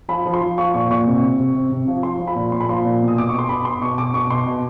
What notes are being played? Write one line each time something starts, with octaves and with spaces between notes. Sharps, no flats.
F3 B5
F3
C6
F3
F3 C#6
A#2 C#6
A#2 C#6
C3
C3
C3
C3
C3
F3
F3 C6
F3
B5
A#2
A#2 C6
B5
F3 C6
A#2
B2
D#6
B2 D6
B2 C#6
C6
B2 B5
B2 C6
B2 C#6
B2 D6
B2 C#6
B2 C6
B2